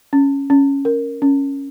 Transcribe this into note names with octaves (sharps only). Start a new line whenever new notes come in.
C#4
C#4
A#4
C#4